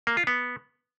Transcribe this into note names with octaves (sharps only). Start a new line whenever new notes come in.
A#3
F4
B3